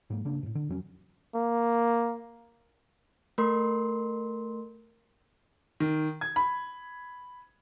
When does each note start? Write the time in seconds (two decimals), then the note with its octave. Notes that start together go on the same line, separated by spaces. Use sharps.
0.10 G#2 F#3 A#3
0.25 C#3 A#3 D4
0.43 F2 A2
0.55 D3
0.69 F2 F#3 C#4
1.34 A#3
3.38 A3 A#4 C6
5.80 D#3
6.21 G#6
6.36 B5